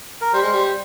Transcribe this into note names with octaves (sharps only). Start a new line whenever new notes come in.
A#4
G3 C5
G#3
G3